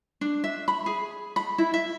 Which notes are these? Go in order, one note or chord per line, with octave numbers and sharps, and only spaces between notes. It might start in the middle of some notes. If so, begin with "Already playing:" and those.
D4
E5
B5
G#4
B5
E4
E5